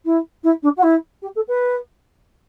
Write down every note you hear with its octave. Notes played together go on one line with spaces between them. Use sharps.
E4
E4
D4
F#4
E4
G4
A4
B4